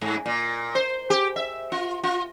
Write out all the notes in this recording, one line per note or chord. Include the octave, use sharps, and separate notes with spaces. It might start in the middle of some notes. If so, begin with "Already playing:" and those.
G#2
A#2
C5
G4
E5
F4
F4